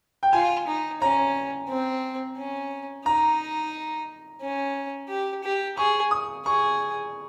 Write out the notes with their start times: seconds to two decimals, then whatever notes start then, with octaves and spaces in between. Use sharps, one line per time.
0.23 G5
0.33 F4 G#5
0.67 D#4
1.01 C#4 A#5
1.69 C4
2.37 C#4
3.06 D#4 A#5
4.41 C#4
5.09 G4
5.43 G4
5.77 G#4 C#6
6.11 D#6
6.46 G#4 C#6